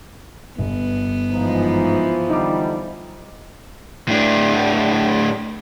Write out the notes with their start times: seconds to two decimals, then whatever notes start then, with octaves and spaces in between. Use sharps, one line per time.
0.58 G1 B3
1.32 G#2 E3 F3 D#4
2.30 D3 G3 D#4 D6
4.08 A2 D4